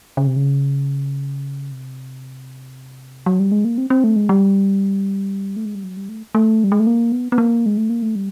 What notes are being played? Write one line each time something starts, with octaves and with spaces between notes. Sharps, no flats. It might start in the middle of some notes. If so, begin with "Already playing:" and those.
C#3
C3
C#3
C3
F#3
G3
G#3
A#3
C4
C4
A3
G#3
G3
A3
G#3
G3
F#3
G3
A3
A3
G3
G#3
A3
A#3
B3
B3
A#3
G#3
A3
A#3
A3
G3